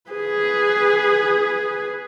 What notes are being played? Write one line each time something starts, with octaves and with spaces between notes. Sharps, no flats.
G#4 B4